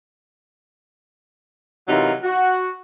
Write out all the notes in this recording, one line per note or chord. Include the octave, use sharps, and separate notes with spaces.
C3 E3 F#3 D#4 F4 A#4
F#4